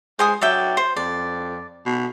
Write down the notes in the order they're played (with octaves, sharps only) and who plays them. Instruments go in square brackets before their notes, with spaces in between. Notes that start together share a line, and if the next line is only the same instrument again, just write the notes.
[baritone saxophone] G#3 [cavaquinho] C5 G#5 D#6
[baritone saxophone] F#3 [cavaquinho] D5 E5 G5
[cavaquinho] C5
[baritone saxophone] F2 [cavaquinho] D5
[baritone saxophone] B2